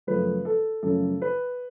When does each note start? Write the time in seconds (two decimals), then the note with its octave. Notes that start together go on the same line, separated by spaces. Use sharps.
0.07 F#2 C#3 F3 A3 B4
0.45 A4
0.83 F#2 C#3 F3 A3 A4
1.22 B4